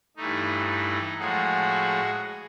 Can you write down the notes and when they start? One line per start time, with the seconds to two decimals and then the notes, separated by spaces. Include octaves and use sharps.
0.17 G2 E3 A3 D#4
0.68 D#4
1.19 A2 F3 G#3 F#4 G#4